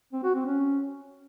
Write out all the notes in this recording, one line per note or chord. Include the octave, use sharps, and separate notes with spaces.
C4
F#4
C4
C#4